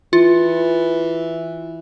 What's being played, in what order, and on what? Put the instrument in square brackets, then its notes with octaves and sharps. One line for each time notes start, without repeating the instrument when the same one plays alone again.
[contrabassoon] E3 [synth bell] F4